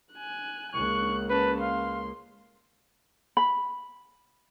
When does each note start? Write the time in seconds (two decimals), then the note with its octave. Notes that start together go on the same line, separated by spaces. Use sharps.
0.14 G#5 F#6
0.74 C#2 A#3 C#6 F#6
1.30 C#4 B4 A5
1.61 F5 C6
3.37 B5